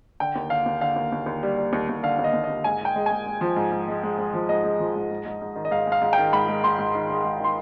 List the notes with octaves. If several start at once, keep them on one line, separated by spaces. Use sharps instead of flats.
D3 G5
D#2
D3 F5
D#2
D3 F5
D#2
D#2
D#2
G3
G3
D#2
D#2
D3 F5
D#2
D#5
D#2
D#5
D#2
G#2 G#5
G#3 G5
G#3
G#5
G#3
G#3
F3
G#2
G#2
G#3
G#3
G#3
F3
G#2 D#5
G#3
F3
G#2
G#2
G#2
G#2
D#3
D#5
G#2 F5
G#3 F5
G#2
G5
D#3
G#2 B5
G#3
G#3 C6
G#2
D#3
G#3
G#2
D#3 C6